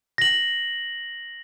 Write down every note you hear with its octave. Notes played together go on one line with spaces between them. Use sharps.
A#6 F#7